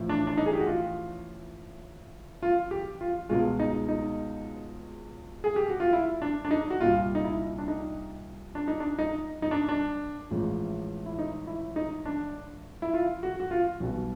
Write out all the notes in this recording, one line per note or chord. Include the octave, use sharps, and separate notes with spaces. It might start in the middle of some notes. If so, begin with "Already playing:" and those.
Already playing: A1 A2 F3
D4
D4
D#4
G#4
G4
F#4
F4
F4
G4
F4
C#2 B2 G#3 F4
D#4
D#4
G#4
G4
F#4
F4
E4
D4
D4
D#4
F#4
C2 A#2 G3 F4
D#4
E4
D4
D#4
D4
D#4
D4
D#4
D#4
D4
D4
A1 A2 F3 G#3
E4
D#4
E4
D#4
D4
E4
F4
F#4
F#4
F4
B1 B2 G3 F#4